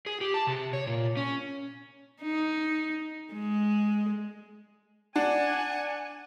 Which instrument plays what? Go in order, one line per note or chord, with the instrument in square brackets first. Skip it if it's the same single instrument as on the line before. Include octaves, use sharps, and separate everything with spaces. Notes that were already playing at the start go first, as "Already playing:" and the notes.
[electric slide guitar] G#4
G4
A5
C3
C#5
A#2
C#4
[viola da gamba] D#4
G#3
[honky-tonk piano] D4 [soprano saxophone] F#5 [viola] G#5